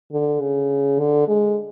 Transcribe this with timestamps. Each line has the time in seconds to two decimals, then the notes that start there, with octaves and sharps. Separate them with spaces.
0.12 D3
0.40 C#3
0.99 D3
1.28 G#3